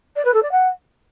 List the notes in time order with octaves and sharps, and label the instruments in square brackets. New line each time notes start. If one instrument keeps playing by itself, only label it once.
[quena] D5
B4
A4
D5
F#5